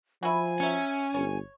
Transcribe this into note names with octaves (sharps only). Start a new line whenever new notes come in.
F3 E4 F#4 G#5
F#3 C#4 E5
G1 C#5